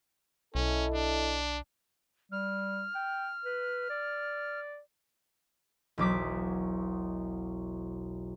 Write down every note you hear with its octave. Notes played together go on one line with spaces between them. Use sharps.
B1 C#4 E4 A4 D#5
D4
G3 F6
G5
B4
D5
E1 B1 D6 B6